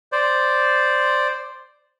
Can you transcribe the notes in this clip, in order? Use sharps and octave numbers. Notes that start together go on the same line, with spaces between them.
C5 D5